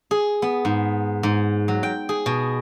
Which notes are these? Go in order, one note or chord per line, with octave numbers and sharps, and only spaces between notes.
G#4
B3
G#2
G#2
F#3
G5
G#4
B2